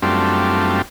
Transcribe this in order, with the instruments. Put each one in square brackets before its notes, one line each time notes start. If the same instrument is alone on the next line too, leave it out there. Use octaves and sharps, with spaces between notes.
[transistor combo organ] F#2 G3 A3 C4 D4 F4